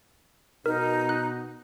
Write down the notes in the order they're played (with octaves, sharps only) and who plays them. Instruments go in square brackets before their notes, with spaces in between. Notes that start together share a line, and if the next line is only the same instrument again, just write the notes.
[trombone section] B2 [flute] D#4 [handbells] A#4
[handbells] F#6